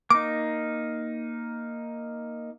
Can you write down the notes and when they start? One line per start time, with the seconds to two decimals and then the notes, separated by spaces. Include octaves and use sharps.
0.10 A#3 D#4 D6